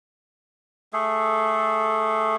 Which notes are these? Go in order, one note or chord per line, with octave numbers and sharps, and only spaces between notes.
A3 G#4 A4